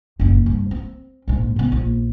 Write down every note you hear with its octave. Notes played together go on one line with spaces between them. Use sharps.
F#1 A#2
G2
C4
A#1 G#2
C3 B3
A#1